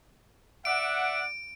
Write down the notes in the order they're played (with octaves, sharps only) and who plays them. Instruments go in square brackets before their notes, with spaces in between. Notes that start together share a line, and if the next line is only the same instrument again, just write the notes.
[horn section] D5 E5 F#5 [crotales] D7